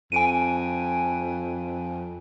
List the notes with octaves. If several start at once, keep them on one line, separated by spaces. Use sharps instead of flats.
F2 G#5 D7 D#7